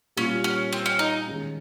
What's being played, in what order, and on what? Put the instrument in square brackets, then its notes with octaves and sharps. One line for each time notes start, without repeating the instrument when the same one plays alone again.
[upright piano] A#2 G3 A#3 [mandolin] C#4
[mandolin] C#4
C4
C#4
D#4
[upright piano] D#3 G#3 C#4